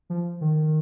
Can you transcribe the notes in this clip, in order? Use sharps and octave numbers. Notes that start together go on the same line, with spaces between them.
F3
D#3